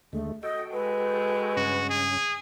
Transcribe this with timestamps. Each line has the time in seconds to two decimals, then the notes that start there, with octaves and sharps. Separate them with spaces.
0.13 D#2 D3 G#3 A3
0.43 F#4 A4 D#5 G5
0.73 G#3 B4
1.56 G2 C#3 C#4 F#4
1.90 G#4